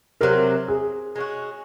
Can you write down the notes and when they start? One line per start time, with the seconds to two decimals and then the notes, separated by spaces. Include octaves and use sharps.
0.21 C3 F#3 C4 A#4
0.68 G#4
1.16 G#3 C#4 F#4